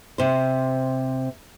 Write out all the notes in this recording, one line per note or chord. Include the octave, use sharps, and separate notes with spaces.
C3 C5